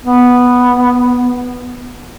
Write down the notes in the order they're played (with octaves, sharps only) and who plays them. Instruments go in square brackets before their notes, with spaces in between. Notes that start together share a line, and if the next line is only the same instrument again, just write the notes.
[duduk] B3